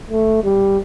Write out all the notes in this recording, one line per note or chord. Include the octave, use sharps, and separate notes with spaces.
A3
G3